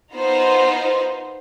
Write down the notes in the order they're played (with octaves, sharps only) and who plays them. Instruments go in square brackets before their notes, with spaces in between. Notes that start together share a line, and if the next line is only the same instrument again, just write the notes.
[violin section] B3 D#4 F4 C5